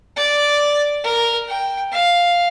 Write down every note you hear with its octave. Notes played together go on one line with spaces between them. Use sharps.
D5
A#4
G5
F5